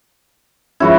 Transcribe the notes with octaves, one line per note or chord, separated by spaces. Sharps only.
F3 G#3 C#4 E4 F#4 B4